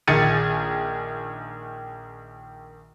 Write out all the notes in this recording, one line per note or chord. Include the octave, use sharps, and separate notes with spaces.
A#1 D#3 G#4 A6 C#7 D#7